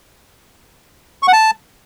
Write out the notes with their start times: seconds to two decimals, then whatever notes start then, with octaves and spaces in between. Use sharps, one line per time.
1.23 C#6
1.28 F#5
1.33 A5